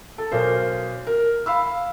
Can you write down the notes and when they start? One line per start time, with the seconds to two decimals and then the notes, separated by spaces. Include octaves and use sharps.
0.18 A4
0.32 B1 A#4 C5
1.07 A#4
1.46 F5 B5 E6